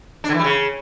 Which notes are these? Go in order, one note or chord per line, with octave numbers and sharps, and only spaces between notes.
D4
D3
E3
G3
C#3